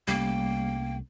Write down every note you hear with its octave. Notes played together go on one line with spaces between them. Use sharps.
C2 G3 A3 A#3 C#4 G5